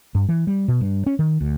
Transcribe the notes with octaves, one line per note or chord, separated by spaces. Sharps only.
G2
E3
G3
B2
G2
C#4
D#3
D2